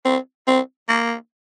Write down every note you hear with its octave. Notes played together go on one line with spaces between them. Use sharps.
C4
C4
A#3